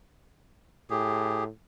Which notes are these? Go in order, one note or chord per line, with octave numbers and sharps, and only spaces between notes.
A2 G4 G#4